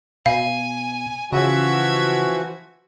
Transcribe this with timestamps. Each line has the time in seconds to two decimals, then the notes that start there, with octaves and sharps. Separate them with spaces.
0.26 B2 F5 G#5
1.32 C#3 E3 F3 F#4 E5 G#6